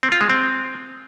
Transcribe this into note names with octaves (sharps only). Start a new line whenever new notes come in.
C4
F4
G#3
C4